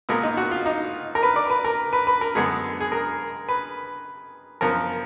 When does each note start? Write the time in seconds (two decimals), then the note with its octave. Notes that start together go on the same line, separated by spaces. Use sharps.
0.09 A#2 G#3 B3 A#4
0.23 D#4
0.37 F#4
0.51 F4
0.66 D#4
1.15 A#4
1.23 B4
1.36 D5
1.50 B4
1.65 A#4
1.93 B4
2.07 B4
2.21 A#4
2.35 F#2 D3 G#3 B3 G#4
2.81 G#4
2.92 A#4
3.49 B4
4.61 F#2 F3 B3 A#4